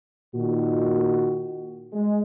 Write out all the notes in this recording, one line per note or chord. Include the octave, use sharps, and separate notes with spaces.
A#2 D#3 F#4
G#3